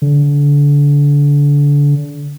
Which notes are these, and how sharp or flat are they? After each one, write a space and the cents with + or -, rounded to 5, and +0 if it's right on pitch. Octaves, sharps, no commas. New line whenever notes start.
D3 -30